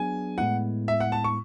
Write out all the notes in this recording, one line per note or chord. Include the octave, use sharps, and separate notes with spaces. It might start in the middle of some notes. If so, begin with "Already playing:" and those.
Already playing: F#3 B3 D4 G#4 G#5
A2 G#3 B3 E4 F#5
E5
F#5
A5
C#6